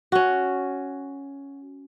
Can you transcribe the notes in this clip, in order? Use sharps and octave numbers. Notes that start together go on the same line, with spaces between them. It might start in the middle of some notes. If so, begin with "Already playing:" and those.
C#4 F#4